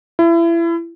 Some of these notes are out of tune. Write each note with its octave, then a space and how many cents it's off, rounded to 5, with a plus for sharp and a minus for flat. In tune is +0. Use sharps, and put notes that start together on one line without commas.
E4 +30